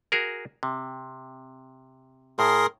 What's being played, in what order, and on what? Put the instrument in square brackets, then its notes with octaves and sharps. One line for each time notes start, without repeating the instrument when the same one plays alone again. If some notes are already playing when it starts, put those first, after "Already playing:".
[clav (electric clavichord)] F#4 G#4 A#4
C3
[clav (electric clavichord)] A2 [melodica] G#4 A#4 C6